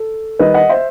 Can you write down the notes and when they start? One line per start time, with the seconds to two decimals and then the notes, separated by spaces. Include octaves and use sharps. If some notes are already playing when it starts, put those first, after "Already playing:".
Already playing: A4
0.39 D#3 G3 D#4 B4 D#5
0.54 D#5 F#5
0.69 C5 E5